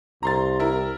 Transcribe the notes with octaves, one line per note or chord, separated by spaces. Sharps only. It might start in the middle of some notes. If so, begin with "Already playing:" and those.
C2 A#5 C6 A6
E4 A#4